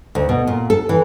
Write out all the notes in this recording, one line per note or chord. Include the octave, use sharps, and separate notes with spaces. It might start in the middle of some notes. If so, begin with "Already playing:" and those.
D2
B2
A#2
A4
E3